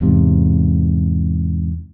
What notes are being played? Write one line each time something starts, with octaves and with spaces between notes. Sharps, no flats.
E2 G#2 C3